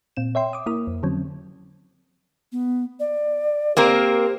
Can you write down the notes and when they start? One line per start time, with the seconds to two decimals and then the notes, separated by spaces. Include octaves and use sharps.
0.17 A#2 C4 E7
0.35 C#5 E5 G5 C6
0.53 D6 D#6
0.66 A#3 E4 A#4 D#6
0.87 F2
1.03 D3 F3 F#3 C4 C#4
2.52 B3
3.00 D5
3.77 A#3 C4 G4 A#4